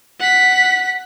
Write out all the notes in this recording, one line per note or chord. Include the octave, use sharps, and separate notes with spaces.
F#5 B6